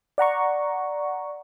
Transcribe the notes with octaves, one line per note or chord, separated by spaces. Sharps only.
D5 F#5 A#5 C#6